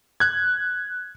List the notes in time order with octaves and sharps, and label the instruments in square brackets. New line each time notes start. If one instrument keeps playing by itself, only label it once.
[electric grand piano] F#6 G#6